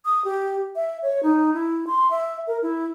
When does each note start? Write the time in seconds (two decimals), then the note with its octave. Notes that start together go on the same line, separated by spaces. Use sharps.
0.05 D#6
0.25 G4
0.76 E5
1.02 C#5
1.23 D#4
1.54 E4
1.87 C6
2.11 E5
2.47 A#4
2.63 E4